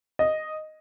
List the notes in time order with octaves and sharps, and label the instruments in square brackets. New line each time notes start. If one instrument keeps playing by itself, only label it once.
[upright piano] D#5